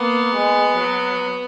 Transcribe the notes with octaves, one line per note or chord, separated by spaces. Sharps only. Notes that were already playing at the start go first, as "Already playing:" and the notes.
Already playing: A#3 B3
G#3
F#3